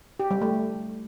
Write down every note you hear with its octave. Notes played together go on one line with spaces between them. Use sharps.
G4
G3
A3